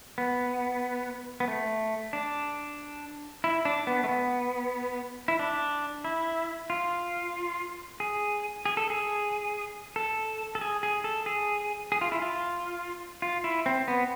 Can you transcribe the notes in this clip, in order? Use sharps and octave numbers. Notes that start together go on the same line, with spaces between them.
B3
B3
A3
D4
E4
D4
B3
A3
B3
E4
D4
E4
F4
G#4
G#4
A4
G#4
A4
A4
G#4
G#4
A4
G#4
G#4
F4
E4
F4
F4
E4
C4
B3